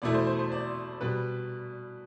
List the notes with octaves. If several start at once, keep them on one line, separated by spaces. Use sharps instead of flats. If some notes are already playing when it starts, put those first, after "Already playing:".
E2 B2 A3 E4 D5
C5
C5
C5
D5
B2 G3 B4